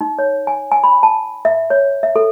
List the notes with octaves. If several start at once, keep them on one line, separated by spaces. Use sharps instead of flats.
D#4
C#5
G#5
G#5
B5
A5
E5
C#5
E5
A4